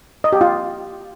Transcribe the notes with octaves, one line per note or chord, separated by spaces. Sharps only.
D#5
G4
F4